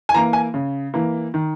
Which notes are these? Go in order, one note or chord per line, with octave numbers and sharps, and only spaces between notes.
G#5
E3 A#3 A#5
G#5
C#3
E3 A#3
D#3